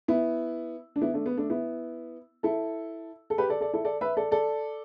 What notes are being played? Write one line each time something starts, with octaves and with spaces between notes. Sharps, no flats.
B3 E4
D4
B3 E4
A3 D4
B3
A3 D4
B3 E4
E4 A4
A4
G4 B4
A4 D5
A4 D5
E4 A4
A4 D5
B4 E5
A4 D5
A4 D5